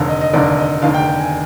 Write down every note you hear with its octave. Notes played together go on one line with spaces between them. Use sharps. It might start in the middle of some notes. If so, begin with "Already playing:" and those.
Already playing: F1 D#2 D3 F5
D#5
D#5
F1 D#2 D3 D5
D#5
F1 D#2 D3 F5
G5
G5
G#5